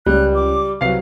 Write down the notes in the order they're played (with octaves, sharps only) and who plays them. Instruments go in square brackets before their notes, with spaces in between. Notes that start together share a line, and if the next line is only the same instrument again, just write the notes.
[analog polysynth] C#2 [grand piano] G3 [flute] F#6
[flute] D6
[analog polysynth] C2 F#3 [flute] B4 [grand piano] F5 C7